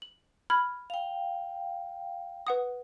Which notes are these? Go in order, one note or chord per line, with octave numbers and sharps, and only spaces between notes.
F#7
B5 F6 G#6
F5 G5
B4 F#5 D#6